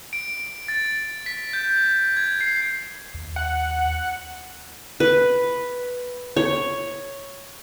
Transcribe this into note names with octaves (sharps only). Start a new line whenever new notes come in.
D7
A6
B6
G6
G#6
C7
D#2
F#5
B4
C#5